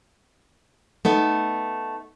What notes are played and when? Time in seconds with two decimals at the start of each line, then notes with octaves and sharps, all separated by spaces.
1.05 A3 B3 D#4